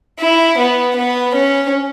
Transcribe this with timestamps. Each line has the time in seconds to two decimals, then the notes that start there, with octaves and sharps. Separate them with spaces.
0.20 E4
0.58 B3
0.97 B3
1.35 C#4